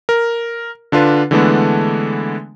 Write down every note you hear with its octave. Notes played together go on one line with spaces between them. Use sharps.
A#4
D3 D4 F4 B4
D3 E3 G#3 A3 B3 D4